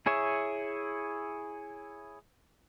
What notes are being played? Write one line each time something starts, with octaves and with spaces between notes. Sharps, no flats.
E4 G#4 C#5 E5